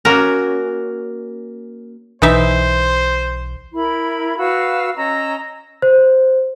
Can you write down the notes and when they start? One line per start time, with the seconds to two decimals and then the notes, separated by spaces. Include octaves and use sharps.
0.05 A#3 C#4 F#4 A#4
2.22 B1 E3 D#4 C5 E5
3.74 E4 A#4 B5
4.37 F#4 B4 F5 E6
4.95 C#4 D#5 A#5 E6
5.82 C5